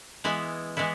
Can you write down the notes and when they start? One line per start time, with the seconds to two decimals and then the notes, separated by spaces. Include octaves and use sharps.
0.24 E3 G#3 B3 E4
0.77 E3 G#3 B3 E4